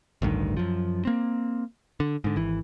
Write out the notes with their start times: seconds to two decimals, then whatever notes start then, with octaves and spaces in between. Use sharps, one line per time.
0.22 A1 D2 G2 D#3
0.57 F#2 F3
1.05 A#3 C4
2.00 D3
2.24 G#2 D3
2.36 G#1 E3